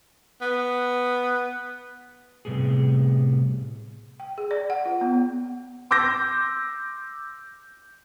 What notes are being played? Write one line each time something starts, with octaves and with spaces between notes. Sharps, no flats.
B3
A2 C3 E3 G3 B3 G#4
G5
G#4
D5
F#5
F4
B3
C6 D6 E6 G6 A#6